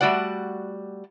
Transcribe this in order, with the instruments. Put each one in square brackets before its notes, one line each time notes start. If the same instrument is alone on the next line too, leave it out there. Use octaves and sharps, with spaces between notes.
[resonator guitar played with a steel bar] G3 A3 F#4 D5 F#5